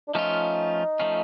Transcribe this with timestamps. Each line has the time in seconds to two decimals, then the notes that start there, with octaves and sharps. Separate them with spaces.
0.08 D4
0.14 F3 A3 C#4 D#4 F4
1.00 F3 A3 C#4 F4